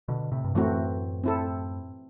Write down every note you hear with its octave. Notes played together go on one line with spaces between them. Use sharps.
B2 D3
A2 C3
G2
F#2 A2 E3 A3 C4 F#4
C4 E4 A4